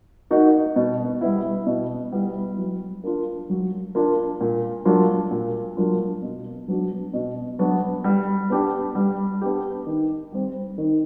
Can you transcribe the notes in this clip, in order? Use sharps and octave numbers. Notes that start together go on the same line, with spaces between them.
A#3 D#4 F#4
B2
G3 B3 E4
B2
G3 B3 E4
F#3
A#3 D4 F4
F#3
A#3 D4 F4
A#2
F#3 A#3 D4 F4
A#2
F#3 A#3 D4 F4
B2
F#3 B3 D4 F#4
B2
F#3 B3 D4 F#4
G3
B3 D4 G4
G3
B3 D4 G4
D#3
G3 C4
D#3